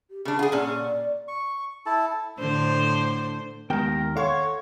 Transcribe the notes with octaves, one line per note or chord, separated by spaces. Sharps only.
G4
C#3 D4 G#4
F4 G#4 F#5
A#2 C#4 D5
C#6
E4 A4 A5
A2 D3 C5
D#2 G#3 B3 A#4 G5
A4 C#5 F5 F#5 C6 C#6